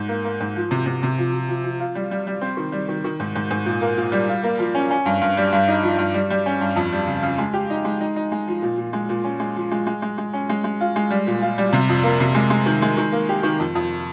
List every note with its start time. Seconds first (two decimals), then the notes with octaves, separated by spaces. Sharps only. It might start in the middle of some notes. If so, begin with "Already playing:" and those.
Already playing: G#2
0.09 A#3
0.24 A#3
0.41 G#2
0.56 F3
0.71 C3
0.86 C3
1.03 C3
1.18 F3
1.33 F3
1.48 F3
1.64 F3
1.80 F4
1.95 G3
2.11 G3
2.27 G3
2.41 C4
2.57 D#3
2.72 G3
2.88 D#3
3.04 D#3
3.20 G#2
3.36 G#2
3.51 G#2
3.66 A#2
3.82 A#3
3.97 A#2
4.12 G3
4.28 F4
4.43 A#3
4.59 F3
4.75 C#4
4.91 C#4
5.06 G2
5.21 G2
5.37 G3
5.52 G2
5.68 D#4
5.83 F3
5.98 G2
6.14 G3
6.30 G3
6.46 C#4
6.61 G2
6.76 F2
6.93 G3
7.07 C#3
7.23 C#3
7.38 G#3
7.53 G4
7.70 D#4
7.85 G#3
8.01 D#4
8.16 D#4
8.32 G#3
8.48 F3
8.62 A#2
8.78 A#2
8.93 G#3
9.09 A#2
9.24 C#4
9.40 G#3
9.56 F3
9.71 G#3
9.87 G#3
10.02 G#3
10.18 G#3
10.33 C#4
10.49 G#3
10.64 G#3
10.81 F4
10.96 G#3
11.11 G3
11.27 A#2
11.42 F4
11.58 G3
11.73 C3
11.89 F2
12.03 A#3
12.20 C3
12.35 G#3
12.50 G#3
12.66 D#3
12.82 G#3
12.97 D#3
13.12 A#3
13.29 G4
13.43 D#3
13.59 F2
13.75 F2